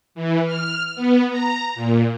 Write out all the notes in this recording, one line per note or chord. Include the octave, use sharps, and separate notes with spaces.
E3
F6
B3
A#5
A#2